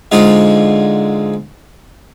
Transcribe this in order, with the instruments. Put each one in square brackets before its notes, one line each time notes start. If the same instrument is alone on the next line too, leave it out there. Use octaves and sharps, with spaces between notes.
[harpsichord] G#2 D3 G#3 F4